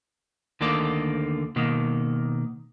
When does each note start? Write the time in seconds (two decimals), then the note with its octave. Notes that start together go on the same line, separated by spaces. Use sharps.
0.61 D2 D3 D#3 A#3 A4 D5
1.56 B2 D#3 A#3